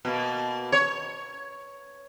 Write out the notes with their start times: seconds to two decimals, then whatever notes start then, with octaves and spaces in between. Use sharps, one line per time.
0.05 B2 A#3
0.72 C#5